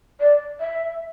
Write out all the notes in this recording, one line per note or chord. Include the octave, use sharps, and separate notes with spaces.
D5
E5